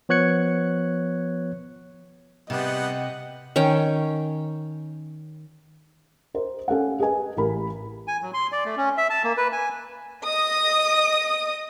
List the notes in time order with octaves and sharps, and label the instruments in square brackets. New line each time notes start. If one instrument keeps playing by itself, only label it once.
[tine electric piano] F3 B3 C#5 F#6 G#6 C#7
[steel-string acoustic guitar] C3 [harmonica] G3 B3 [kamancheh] D#5 F#5
[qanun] D#3 C#4 C#5 G5
[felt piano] A#4 C5
C#4 A4 F5 F#5
G#4 B4 D#5 G#5
A1 G4 A#4 B5
[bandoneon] G#5
F#3
C6
D5
A3
C#4
E5
A5
A#3
B4
G#5
[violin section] D#5 D#6